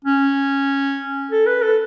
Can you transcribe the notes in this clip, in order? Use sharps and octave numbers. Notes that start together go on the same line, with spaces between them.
C#4
A4
B4
A4